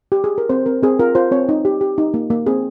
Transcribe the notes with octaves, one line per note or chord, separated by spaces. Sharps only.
G4
G#4
A#4
C4 C5
C4 A#4
C4 G#4
F4 A#4
F4 C5
C4 C#5
D#4
G4
G4
D#4
A#3
A#3
C4 G#4